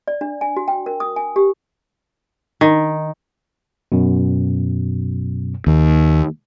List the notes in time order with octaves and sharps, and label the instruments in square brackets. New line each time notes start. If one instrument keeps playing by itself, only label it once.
[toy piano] D5
D4
G#5
F#4
G5
A#4
D#6
G#5
G4
[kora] D#3
[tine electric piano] F#2 B2
[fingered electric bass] D#2